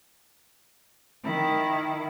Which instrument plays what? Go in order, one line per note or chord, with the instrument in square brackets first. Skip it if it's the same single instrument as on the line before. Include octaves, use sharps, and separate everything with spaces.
[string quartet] D#3 E4